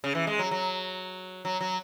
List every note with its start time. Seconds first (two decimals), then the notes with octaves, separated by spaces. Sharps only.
0.04 C#3
0.15 E3
0.27 G#3
0.39 F#3
0.51 F#3
1.45 F#3
1.61 F#3